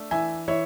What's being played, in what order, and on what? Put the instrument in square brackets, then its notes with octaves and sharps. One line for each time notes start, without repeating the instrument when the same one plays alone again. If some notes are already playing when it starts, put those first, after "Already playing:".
Already playing: [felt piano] A3 D4
E3 E5 G#5
E3 C#5 E5